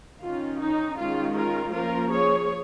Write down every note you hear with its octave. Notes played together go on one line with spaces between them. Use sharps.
D#3 C#4 F4
D#4
D#3 G#3 C#4 F4
F4 A#4
F3 A#3 C#4 F4 A#4
G#4 C#5